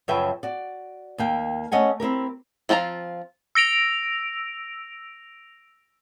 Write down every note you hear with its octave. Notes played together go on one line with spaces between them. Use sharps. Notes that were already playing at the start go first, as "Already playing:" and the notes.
F#2 C#3 F3 B4 E5 G5
F#4 D5
D#2 A#3 G5
A3 C#4 D#5 F#5 G#5
C4 E4 G4 A#4
F3 C4 F4 A4 A#5
E6 A#6 D7 F7